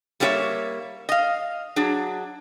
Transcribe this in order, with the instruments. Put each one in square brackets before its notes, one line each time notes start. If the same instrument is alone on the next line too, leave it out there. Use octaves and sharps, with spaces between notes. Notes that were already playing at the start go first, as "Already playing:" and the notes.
[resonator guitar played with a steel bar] G3 A#3 C#4 G4 C#5 E5
D#5 F5
F#3 D4 G#4